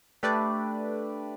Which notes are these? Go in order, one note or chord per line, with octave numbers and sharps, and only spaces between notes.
A3 D4 G4 B4 D5